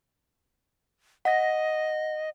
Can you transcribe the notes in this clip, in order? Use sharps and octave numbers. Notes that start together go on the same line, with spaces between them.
D#5 F#5 A#6